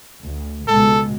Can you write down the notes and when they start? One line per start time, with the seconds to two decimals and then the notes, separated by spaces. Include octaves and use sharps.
0.23 D2
0.68 C#2 B2 G#3 A4